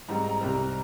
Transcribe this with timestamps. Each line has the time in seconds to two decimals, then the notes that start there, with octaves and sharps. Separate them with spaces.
0.08 G#2 G3 C4 A#5
0.24 A#5
0.41 C2 C3 G3 C4